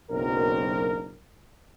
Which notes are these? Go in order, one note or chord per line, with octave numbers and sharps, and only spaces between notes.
F#1 B1 B2 C4 D4 A#4